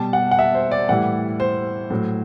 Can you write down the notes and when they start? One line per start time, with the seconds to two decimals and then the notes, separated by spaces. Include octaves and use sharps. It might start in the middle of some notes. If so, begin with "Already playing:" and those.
Already playing: B2 G3 A5
0.13 F#5
0.31 F#5
0.39 E5
0.55 C5
0.71 D5
0.89 A2 E3 G3 F#5
1.40 C5
1.90 A2 F#3